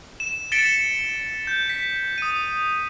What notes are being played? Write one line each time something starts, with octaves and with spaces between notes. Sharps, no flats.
E7
A6 B6 C#7 D7 E7 G7
E7
G6
B6
D#6 D#7